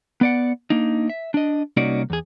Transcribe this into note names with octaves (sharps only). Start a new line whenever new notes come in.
B3 D5 F#5
A#3 D4 D#4
E5
D4 D#5
C2 A#3 C#4 D#4 F#4 D5
E2 G#4